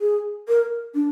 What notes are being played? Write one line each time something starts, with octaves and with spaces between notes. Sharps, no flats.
G#4
A#4
D4